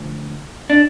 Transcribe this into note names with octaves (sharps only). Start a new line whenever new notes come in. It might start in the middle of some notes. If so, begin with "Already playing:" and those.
Already playing: D2 F3
D4